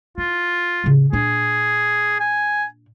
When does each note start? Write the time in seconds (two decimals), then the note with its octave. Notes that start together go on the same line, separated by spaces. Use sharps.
0.18 E4 F4
0.84 A2 C#3
1.13 A#2 D4 G#4
2.20 G#5